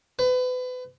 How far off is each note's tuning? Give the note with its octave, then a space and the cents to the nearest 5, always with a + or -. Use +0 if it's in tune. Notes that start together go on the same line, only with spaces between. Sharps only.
B4 +30